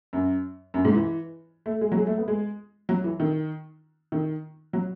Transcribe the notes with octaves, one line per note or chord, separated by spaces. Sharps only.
F#2
F#2
G#2
E3
A3
G#3
F#3
G#3
A3
B3
G#3
F#3
E3
D#3
D#3
F#3